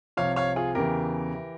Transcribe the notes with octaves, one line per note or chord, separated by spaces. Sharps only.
C2 C3 F3 C#5 F5
C#5 F5
F4 G#4
E2 C#3 E3 G4 A#4
E3